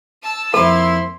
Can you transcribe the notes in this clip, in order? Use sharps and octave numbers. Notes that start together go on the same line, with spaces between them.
A5 E6
F2 A#3 E4 A4 C6 D#6